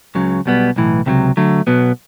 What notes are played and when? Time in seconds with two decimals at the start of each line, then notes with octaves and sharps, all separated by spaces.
0.15 C#2 C#3 F#3
0.46 B1 B2 G3 B3
0.76 B1 A2 E3
1.06 C#2 C3 D#3 F#3
1.37 D3 F#3 A3
1.67 B1 B2 F#3 B3